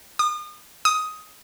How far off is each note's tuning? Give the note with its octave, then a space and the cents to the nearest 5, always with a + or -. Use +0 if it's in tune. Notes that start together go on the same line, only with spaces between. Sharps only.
D#6 -40
D#6 +10